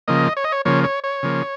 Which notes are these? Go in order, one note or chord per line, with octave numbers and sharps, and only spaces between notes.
C#3 F3 A#3 D#5
C#5
D#5
C#5
C#3 F3 A#3 C#5
C#5
C#5
C#3 F3 A#3